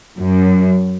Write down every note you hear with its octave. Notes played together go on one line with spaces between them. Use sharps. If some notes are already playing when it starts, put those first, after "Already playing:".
F#2